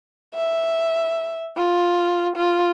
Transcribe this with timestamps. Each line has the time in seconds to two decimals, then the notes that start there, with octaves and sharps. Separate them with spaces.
0.34 E5
1.57 F4
2.36 F4